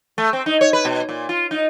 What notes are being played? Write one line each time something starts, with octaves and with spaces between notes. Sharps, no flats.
A3
C4
D#4
C#5
B4
B2
A#2
F4
D#4